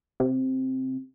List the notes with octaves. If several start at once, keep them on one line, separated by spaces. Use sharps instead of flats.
C3